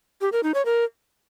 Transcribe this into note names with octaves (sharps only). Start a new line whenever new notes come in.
G4
A#4
D#4
C#5
A#4